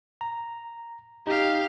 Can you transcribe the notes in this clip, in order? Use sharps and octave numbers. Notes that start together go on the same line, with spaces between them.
A#5
D#4 G4 F5